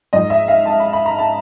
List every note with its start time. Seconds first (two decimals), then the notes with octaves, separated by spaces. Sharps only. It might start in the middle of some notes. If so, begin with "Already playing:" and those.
0.13 G#2 F3 D#5
0.30 E5
0.48 F5
0.65 A5
0.80 B5
0.93 B5
1.06 A#5
1.19 A5